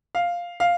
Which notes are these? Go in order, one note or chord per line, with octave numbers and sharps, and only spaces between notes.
F5
F5